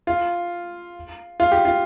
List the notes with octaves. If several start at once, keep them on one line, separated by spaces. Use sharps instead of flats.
F4
F4
G4
F4